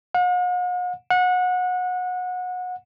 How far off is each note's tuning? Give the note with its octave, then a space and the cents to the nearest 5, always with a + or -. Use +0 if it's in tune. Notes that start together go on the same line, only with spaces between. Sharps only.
F#5 -45
F#5 -25